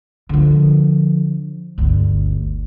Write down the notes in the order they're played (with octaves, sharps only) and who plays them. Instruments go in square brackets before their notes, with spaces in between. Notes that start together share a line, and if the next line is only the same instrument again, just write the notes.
[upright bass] D3 F3
G1 D2